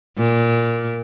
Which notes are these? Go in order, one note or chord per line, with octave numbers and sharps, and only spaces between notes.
A#2